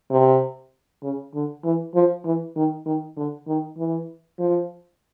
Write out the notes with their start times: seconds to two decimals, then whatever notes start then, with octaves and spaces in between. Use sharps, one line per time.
0.11 C3
1.03 C#3
1.34 D3
1.64 E3
1.95 F3
2.25 E3
2.56 D#3
2.86 D#3
3.17 D3
3.47 D#3
3.78 E3
4.39 F3